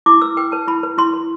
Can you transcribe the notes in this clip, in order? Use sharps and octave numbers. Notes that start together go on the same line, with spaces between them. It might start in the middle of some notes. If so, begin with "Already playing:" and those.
E4 D6
B4 E6
B4 G5
B4 A5
E4 B5
B4
E4 C6
B4